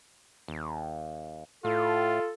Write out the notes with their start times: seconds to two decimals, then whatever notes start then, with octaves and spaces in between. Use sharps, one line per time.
0.48 D#2
1.65 A2 F4 A4